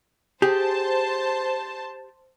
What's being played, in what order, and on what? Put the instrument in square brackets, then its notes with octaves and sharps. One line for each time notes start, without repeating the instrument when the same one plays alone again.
[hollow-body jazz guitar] G4 G#4 [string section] C5 A5